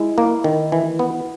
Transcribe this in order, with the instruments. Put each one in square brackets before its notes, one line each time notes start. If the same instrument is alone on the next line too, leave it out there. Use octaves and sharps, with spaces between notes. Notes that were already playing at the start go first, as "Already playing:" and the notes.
Already playing: [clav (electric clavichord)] G#3 [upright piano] E4
[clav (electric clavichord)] A#3
D#3
E3
B3